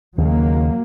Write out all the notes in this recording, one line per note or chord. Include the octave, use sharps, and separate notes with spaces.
D#2 C#3 F#3 A#3